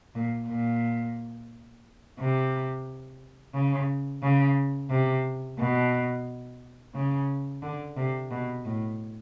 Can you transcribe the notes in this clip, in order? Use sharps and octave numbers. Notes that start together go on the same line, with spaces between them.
A#2
A#2
C3
C#3
C#3
C3
B2
C#3
D3
C3
B2
A2